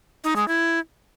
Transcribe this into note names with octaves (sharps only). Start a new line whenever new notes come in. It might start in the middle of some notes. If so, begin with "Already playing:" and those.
D#4
G#3
E4